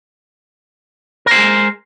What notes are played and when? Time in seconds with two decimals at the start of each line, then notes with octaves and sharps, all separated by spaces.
1.26 A#4
1.31 C5
1.36 G#3